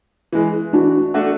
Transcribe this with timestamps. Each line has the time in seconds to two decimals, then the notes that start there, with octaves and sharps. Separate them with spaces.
0.33 E3 G#3
0.73 E3 D4 F#4
1.14 A3 D4 F#4